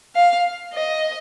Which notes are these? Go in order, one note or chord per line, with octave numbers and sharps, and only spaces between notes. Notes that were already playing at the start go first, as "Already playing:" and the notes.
F5
D#5